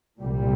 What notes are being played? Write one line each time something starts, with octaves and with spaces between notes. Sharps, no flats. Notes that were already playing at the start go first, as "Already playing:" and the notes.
C2 A#2 G3